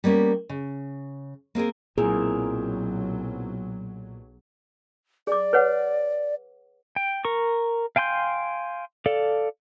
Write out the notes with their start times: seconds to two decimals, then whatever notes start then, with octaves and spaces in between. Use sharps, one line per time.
0.04 G3 A#3 B3 C#4
0.49 C#3
1.55 A#3 C4 G#4 A#4
1.98 B1 A#2 F#3 C4 E4 G#4 A#4
5.27 G#4 D5 D6
5.53 B4 C#5 F#5
6.96 G5
7.25 A#4 C#6
7.96 F5 G5 G#5 C6 G6
9.06 A4 D5 F5